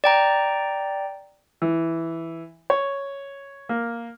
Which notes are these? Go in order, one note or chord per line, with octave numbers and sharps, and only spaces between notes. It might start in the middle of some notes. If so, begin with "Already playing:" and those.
D5 G5 A#5
E3
C#5
A#3